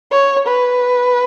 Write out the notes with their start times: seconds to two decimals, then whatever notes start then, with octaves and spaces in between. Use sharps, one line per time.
0.11 C#5
0.47 B4